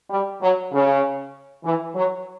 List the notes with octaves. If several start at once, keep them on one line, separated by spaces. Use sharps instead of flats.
G3
F#3
C#3
E3
F#3